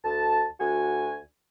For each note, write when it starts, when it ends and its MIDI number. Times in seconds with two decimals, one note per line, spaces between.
0.04 0.45 38
0.04 0.45 81
0.59 1.16 38
0.59 1.16 66
0.59 1.16 80